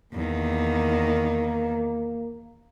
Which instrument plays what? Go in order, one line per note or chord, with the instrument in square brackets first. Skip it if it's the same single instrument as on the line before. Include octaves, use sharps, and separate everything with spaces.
[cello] E2 D#3 [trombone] A#3